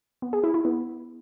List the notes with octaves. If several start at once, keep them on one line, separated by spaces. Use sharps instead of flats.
B3
G#4
E4
E4
B3